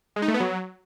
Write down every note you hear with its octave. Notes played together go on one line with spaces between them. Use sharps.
G#3
D#4
A3
B3
F#3